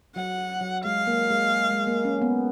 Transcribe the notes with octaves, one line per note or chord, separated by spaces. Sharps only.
F#3 F#5
F#3
G#3 F5
A#3
G#3
G#3
A#3
C#4
B3